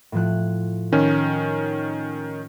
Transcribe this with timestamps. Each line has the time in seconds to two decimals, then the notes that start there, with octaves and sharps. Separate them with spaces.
0.12 A2 F3 F#6
0.92 D#3 C#4